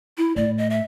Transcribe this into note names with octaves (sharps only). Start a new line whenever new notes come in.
E4
A2 D5
D#5
E5